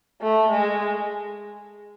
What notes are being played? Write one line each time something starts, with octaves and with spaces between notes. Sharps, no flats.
A3
G#3